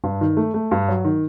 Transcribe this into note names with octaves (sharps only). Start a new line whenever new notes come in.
G2
D#3
A3
A3
G2
F#3
D#3